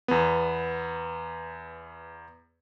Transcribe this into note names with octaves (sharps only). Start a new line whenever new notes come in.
E2 B3